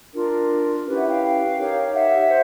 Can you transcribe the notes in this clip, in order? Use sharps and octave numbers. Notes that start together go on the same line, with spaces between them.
D4 F4 A#4
C#4 E4 G4 B4
E5 F#5
F5 G5
D#4 G4 A#4 C#5
E5 F#5
C5